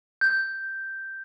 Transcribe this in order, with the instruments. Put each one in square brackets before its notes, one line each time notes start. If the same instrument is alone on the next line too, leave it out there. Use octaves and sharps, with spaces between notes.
[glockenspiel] G6